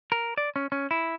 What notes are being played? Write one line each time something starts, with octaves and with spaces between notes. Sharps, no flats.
A#4
D5
C#4
C#4
E4